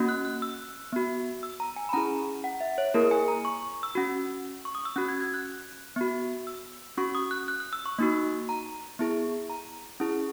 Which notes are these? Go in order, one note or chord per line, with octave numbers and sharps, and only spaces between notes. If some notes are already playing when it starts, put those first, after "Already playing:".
Already playing: A#3 C#4 F#4
F#6
F#6
E6
B3 F#4
E6
A#5
G#5
B5
C#4 E4 G#4 A#5
F#5
E5
C#5
A#3 E4 G#4 A#4
G#5
A#5
C#6
E6
C#4 F#4
C#6
D#6
E6
C#4 F#4 F#6
G#6
G#6
F#6
B3 F#4
E6
C#4 F#4 C#6
D#6
F#6
F#6
F#6
E6
C#6
A#3 D#4 F#4
A#5
B3 E4 G#4
A#5
C#4 E4 G#4